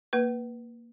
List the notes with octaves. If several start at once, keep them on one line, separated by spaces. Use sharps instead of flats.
A#3 B4